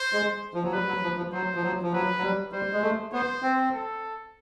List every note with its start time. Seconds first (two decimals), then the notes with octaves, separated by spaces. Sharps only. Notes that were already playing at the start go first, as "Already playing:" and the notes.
Already playing: C5
0.13 G#3
0.54 F3
0.63 F#3
0.72 G3 B4
0.88 F#3
1.03 F3
1.17 F3
1.32 F#3 C5
1.55 F3
1.63 F#3
1.82 F3
1.93 F#3 B4
2.18 F#3
2.23 G3
2.52 G3 C5
2.73 G#3
2.82 A3
3.13 B3 C5
3.42 C4
3.73 A4